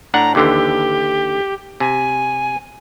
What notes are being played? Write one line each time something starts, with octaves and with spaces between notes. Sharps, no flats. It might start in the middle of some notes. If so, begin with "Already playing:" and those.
A2 D4 F#5 A#5
D#2 D3 E3 G4
C3 G#5